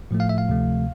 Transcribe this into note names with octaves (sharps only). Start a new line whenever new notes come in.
A2 F3 A3
F5
E5
F5
D2 C3 F3 A3